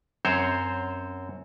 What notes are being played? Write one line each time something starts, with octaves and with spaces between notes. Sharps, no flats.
F#2 C4 C5 C#5